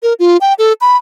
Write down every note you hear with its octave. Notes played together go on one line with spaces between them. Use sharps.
A#4
F4
G5
A4
B5